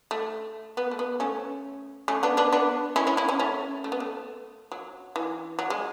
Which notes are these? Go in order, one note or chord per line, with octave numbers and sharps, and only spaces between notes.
A3
B3
A3
B3
A3 C#4
A3 C#4
B3 D4
B3 D4
B3 D4
C#4 E4
C#4 E4
C#4 E4
C#4 E4
A3 C#4
A3
B3
A3
F#3
E3
F#3
G#3